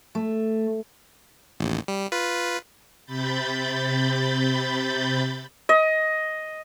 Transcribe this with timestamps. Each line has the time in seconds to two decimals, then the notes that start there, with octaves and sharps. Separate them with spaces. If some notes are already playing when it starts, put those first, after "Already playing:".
0.15 A3
1.60 A1 D#2
1.88 G3
2.12 F4 B4
3.06 C3 B5 G6 A6
5.69 D#5